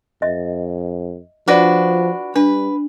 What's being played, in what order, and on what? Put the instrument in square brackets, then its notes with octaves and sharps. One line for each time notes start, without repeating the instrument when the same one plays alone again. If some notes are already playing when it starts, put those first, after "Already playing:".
[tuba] F2 [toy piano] D#5 E5
[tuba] F3 [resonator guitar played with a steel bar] D4 F#4 B4 [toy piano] F4 D5
[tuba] G3 [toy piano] D4 [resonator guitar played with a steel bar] B4